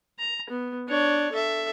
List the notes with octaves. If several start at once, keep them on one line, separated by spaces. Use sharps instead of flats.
A#5
B3
D4 C#5
A4 E5